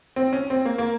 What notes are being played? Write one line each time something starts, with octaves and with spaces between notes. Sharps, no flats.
C4
C#4
C4
A#3
A#3